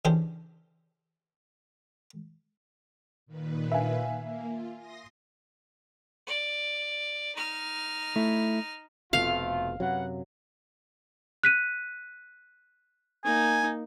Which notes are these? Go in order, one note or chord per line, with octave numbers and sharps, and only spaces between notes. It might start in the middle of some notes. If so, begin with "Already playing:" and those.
C#3 E3 D4 G4 C5 D5
A#2 D#3 B4
E5 F5 G#5
A#3
F4
C6 D#6 A#6
D5
D#4 F6
A3 E4
F1 F2 B2 A3 F4 F5
F#2 C3 F#3 B4 F#5
F#6 B6 D#7
A#3 D#4 G#5